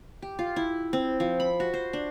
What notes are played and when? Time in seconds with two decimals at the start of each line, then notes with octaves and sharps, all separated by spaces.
0.22 G4
0.39 F4
0.56 E4
0.93 C4
1.20 F3
1.40 B5
1.60 F#4
1.74 C5
1.93 D4